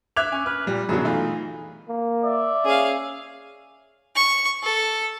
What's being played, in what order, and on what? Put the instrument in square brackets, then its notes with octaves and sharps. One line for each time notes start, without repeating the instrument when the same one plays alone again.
[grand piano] E5 F7 [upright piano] D6 F#6 G#6
[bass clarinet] C#4 [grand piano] G#5
[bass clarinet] B4 [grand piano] F6
[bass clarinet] A#2 [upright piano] G3
[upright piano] F#2 D3 F#3 [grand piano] B2 G#4 [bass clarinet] E4
[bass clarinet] E3 [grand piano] A3 F4 [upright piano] D#4
[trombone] A#3
[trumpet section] D5 E5
[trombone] C#4 [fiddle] G#4 F5
[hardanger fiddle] C#6
A4